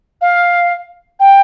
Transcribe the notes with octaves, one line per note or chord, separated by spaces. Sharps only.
F5
G5